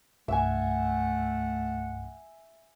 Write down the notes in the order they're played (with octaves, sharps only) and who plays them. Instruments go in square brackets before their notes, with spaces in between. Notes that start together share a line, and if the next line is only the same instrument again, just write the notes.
[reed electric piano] C2 G2 [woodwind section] A3 F#5 [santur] E5 G#5